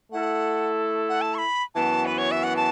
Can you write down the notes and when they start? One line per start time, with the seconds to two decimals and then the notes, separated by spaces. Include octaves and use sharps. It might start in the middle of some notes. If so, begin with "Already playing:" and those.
0.12 A3 E4 A4 F#5
1.09 F#5
1.21 A5
1.35 C#6
1.38 B5
1.75 F#2 E3 B3 F#4 A5
2.06 B4
2.18 C#5
2.31 E5
2.44 F#5
2.56 A5